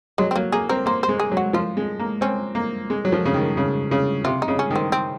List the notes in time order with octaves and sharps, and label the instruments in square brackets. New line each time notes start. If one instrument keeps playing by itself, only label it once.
[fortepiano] F#3 [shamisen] G#3
[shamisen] C4
[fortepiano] F#3 [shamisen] A#3
[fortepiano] A#3 [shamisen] G#4
[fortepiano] C4 [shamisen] A#4
[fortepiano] A#3 [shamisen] C5
[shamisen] C5
[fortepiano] G#3
[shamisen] G#4
[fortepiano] F#3
[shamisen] F#4
[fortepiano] F3 [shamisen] F4
[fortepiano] G#3
A#3
[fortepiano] C4 [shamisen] C#4
[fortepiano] A#3
G#3
F#3
F3
C#3
D#3
C#3
C#3
[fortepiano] C3 [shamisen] F4
[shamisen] D#4
[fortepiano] C#3
[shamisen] C#4
[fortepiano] D#3
[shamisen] C4
C4